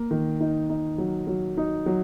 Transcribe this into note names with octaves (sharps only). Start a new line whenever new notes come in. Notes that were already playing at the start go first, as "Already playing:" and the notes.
Already playing: A#3
D#3
D#4
D#4
F#3
F#3
D#4
F#3